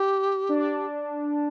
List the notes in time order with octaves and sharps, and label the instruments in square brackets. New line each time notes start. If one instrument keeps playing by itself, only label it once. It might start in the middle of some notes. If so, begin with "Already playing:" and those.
Already playing: [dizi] G4
[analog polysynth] D4